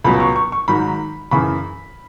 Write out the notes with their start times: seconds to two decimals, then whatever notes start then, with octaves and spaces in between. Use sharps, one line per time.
0.04 C#2 B2 F#3 B5
0.20 C#6
0.36 C#6
0.52 C#6
0.68 G#2 D#3 F#3 B5
1.31 F#2 C#3 E3 B5